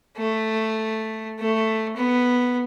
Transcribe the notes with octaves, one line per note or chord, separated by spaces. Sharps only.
A3
A3
B3